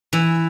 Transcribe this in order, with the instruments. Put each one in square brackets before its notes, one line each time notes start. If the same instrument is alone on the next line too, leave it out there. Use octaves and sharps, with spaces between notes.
[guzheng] E3